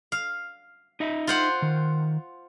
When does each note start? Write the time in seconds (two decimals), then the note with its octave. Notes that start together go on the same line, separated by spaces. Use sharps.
0.12 F5
1.00 D#4 D#5 E5
1.27 F4 C5 F#5
1.62 D#3